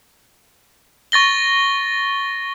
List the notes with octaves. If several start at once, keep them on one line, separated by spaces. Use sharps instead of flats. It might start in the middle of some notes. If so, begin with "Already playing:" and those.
C#6 A6 A#6 G7